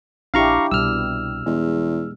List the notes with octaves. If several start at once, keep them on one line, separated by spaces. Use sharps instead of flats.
A#1 D4 E4 G4 F5 A#5 C#6
C2 B2 G3 E6 F6
E2 G#3